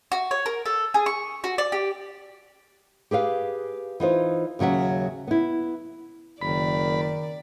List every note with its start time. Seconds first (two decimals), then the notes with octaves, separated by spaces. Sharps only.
0.12 F#4
0.31 C#5
0.46 A#4
0.66 A4
0.94 G#4
1.06 C#6
1.44 F#4
1.58 D5
1.72 G4
3.11 G4 G#4 B4 F5
4.00 E3 D#4 F4 C5
4.59 D#2 C#3 F#3 E5 F#5
5.27 B3 E4
6.42 F#1 D#3 D5 B5